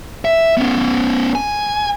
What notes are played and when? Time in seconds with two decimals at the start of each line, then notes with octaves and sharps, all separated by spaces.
0.25 E5
0.57 B3 C#4
1.35 G#5